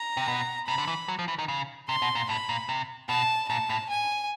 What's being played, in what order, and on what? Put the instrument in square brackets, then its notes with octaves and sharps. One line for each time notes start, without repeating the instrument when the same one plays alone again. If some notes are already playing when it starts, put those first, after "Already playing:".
Already playing: [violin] A#5
[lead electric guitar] C3
B2
[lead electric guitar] C3 [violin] B5
[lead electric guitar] D3
E3
F#3
F3
E3
D#3
C#3
[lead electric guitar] C3 [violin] C6
[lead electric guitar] B2
A#2
[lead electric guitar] A2 [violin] B5
[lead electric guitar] A#2
C3
[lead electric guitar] B2 [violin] A5
[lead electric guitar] A#2 [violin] A5
[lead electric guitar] A2
[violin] G#5